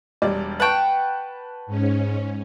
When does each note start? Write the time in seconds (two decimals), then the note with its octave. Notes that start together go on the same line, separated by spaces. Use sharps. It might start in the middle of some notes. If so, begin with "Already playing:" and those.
0.22 E1 G3 D5
0.60 B4 F#5 G5 A5 C#6
1.67 G#2 C#4